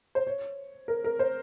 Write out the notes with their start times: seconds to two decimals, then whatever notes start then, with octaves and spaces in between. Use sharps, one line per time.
0.15 C5
0.27 C#5
0.88 A#4
1.04 A#4
1.19 C5